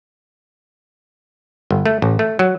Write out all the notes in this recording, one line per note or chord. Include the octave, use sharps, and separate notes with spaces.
G1
A3
A1
A3
F#3